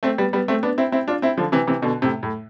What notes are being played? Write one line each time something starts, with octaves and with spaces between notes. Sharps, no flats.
A3 C4
G3 B3
G3 B3
A3 C4
B3 D4
C4 E4
C4 E4
D4 F4
C4 E4
D3 F3
C3 E3
C3 E3
B2 D3
A2 C3
A2